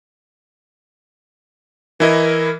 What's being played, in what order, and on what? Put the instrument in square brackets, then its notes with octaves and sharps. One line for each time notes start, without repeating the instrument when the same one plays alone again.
[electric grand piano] E3 E4 D#5 [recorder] A#4